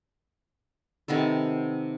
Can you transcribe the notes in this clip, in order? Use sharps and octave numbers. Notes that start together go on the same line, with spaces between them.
C3 D#3 B3 A4